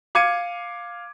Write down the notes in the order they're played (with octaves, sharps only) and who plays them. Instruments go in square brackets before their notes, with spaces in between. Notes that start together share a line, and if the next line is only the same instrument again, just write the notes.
[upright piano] F5 D6 G#6 C#7 D#7